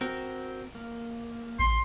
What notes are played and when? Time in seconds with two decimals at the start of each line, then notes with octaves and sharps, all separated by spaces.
0.01 C4 F#4 A#4
0.75 A#3
1.59 A1 C6